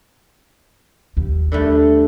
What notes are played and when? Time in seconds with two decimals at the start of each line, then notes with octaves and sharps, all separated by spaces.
1.17 D#2
1.52 D3 G3 A3